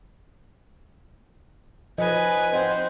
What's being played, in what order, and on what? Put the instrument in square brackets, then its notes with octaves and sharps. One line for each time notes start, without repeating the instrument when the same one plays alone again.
[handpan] F3 D#5 [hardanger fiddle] B4 G#5
[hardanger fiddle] C4 C5 [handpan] D#5 F#5